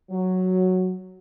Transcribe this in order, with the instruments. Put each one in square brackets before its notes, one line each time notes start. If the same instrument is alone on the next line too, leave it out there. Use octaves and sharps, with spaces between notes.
[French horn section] F#3